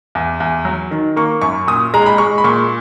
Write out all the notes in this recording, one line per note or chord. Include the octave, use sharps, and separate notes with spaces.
E2
E2
F#3
D#3
A#3 C#6
F#2 C#6
A#2 D#6
G#3 A#5
B5
G#3 C#6
B5
A#2 C#6